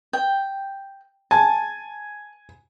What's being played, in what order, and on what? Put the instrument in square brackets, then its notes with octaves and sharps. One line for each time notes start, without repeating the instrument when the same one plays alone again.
[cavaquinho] G5
[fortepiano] G#5 [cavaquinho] A5